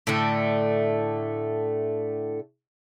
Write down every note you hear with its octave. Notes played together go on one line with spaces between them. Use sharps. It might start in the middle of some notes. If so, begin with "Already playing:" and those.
A2 D3 A3